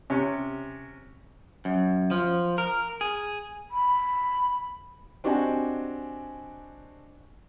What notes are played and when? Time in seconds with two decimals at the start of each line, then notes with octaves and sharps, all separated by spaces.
0.10 C3 C#4
1.65 F#2
2.11 F3
2.58 A#4
3.01 G#4
3.71 B5
5.24 C4 D4 F#4 G4 D#5 G#5